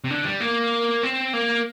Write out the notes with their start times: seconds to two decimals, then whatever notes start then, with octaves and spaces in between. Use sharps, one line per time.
0.04 C3
0.10 D3
0.25 G3
0.40 A#3
1.03 C4
1.33 A#3